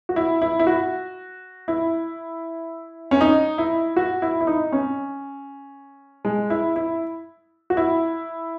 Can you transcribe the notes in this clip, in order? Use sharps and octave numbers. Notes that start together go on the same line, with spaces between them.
F#4
E4
E4
E4
F#4
E4
C#4
D#4
E4
F#4
E4
E4
D#4
C#4
G#3
E4
E4
F#4
E4